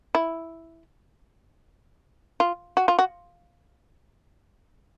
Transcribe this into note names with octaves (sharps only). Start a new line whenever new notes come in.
E4
F4
F#4
F4
F#4